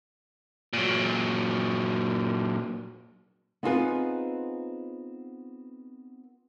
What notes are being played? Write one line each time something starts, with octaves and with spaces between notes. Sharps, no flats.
A#2 F#3
B3 C4 D#4 F4 G#4 B4